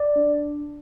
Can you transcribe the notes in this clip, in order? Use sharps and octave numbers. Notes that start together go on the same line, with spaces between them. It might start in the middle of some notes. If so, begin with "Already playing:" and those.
Already playing: D5
D4